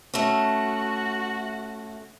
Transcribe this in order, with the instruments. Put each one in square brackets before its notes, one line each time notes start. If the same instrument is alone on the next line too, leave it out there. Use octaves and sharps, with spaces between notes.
[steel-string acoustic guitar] A3 C#4 [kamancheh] F#4